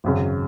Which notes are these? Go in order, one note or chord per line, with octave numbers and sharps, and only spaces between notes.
G#1 F#2 C#3